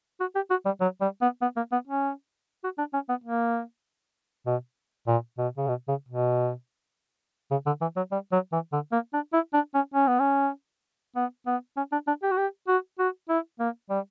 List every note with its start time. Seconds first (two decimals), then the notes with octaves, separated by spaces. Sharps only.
0.20 F#4
0.35 G4
0.50 F#4
0.66 G3
0.81 F#3
1.01 G3
1.22 B3
1.42 B3
1.56 A#3
1.72 B3
1.88 C#4
2.64 F#4
2.78 D4
2.94 C#4
3.09 B3
3.24 A#3
4.47 B2
5.07 A#2
5.38 B2
5.58 C#3
5.68 B2
5.88 C#3
6.08 B2
7.51 C#3
7.66 D3
7.81 E3
7.96 F#3
8.12 G3
8.32 F#3
8.53 E3
8.73 D3
8.92 A#3
9.13 D4
9.33 E4
9.54 D4
9.74 C#4
9.94 C#4
10.07 B3
10.20 C#4
11.16 B3
11.47 B3
11.77 C#4
11.92 D4
12.07 D4
12.23 G4
12.31 F#4
12.37 G4
12.68 F#4
12.99 F#4
13.29 E4
13.60 A#3
13.90 G3